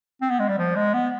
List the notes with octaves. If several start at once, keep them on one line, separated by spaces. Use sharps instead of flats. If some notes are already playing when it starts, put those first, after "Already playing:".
C4
B3
G#3
G3
F3
G#3
B3